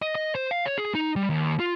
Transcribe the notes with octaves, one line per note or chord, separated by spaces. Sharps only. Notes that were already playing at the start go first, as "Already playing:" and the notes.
D#5
D#5
C5
F5
C#5
G#4
D#4
G3
D#2
F4